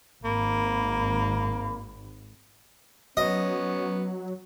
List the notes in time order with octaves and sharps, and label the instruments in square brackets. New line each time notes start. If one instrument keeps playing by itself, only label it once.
[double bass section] G#1 [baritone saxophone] A#3 [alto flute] B5
[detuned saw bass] F#3 [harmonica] B3 C#4 [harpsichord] D#5